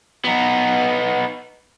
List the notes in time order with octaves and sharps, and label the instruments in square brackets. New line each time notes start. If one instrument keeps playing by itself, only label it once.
[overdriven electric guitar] B3 D#4